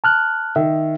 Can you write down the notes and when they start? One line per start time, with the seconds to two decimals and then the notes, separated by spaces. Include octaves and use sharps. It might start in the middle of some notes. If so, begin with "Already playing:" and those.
0.04 A5 F6 F#6
0.56 D#3 E5